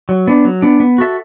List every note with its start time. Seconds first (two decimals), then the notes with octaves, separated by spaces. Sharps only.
0.09 F#3
0.27 B3 D4
0.45 F#3
0.62 B3 D4
0.80 B3
0.98 F#4 A4 E5